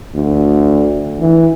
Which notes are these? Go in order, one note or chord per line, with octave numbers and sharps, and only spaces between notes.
D2
E3